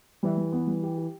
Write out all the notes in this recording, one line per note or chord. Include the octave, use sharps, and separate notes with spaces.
E3 G3
G3
B3
G3
G4
G4